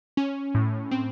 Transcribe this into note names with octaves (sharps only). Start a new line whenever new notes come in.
C#4
A2
C4